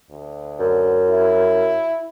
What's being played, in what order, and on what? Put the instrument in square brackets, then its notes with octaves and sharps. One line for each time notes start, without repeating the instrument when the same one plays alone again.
[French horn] D2
[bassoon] F#2
[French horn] E4